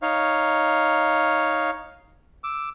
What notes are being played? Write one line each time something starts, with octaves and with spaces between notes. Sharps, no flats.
D#4 C#5 F5
D6 E6